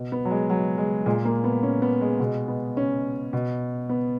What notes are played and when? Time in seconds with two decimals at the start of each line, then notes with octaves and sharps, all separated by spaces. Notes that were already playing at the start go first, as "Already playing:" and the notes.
Already playing: B2
0.12 B3
0.25 F#3
0.31 G#3
0.50 F#3
0.78 G#3
1.06 A#2 G#3
1.25 A#3
1.44 B3
1.63 C#4
1.82 B3
2.01 G#3
2.20 B2 G#3
2.48 B3
2.77 C#4
3.33 B2
3.89 B3